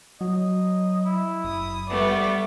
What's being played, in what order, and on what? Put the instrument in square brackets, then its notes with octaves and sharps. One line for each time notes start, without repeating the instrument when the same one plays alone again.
[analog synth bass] F#3 [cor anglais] D#5
[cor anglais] E4
[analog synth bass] F#1 [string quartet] D#6
[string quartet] G3 A3 B3 [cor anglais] D5